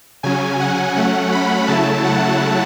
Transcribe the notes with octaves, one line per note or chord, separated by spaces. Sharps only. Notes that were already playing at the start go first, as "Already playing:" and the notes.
C#3 F#3 C#4 G#5
F#5
F#3 A3 C#4 F#5
B5
C#3 F#3 A3 E4 A5
F#5